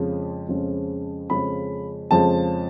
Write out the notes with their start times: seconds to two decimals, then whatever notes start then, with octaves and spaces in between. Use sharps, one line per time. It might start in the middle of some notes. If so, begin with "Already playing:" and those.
Already playing: F2 C#3 F3 G#3 C#4
0.49 F2 C#3 F3 G#3 C#4
1.30 F2 C#3 F3 G#3 C#4 B5
2.11 F2 C#3 F3 G#3 C#4 A5